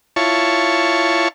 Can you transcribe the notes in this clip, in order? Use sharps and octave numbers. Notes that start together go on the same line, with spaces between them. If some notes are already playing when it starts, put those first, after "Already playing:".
E4 F4 C#5 A5 C#6